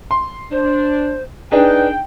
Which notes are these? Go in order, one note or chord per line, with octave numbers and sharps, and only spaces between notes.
C6
D4 C5
D4 D#4 G#4 B4 G5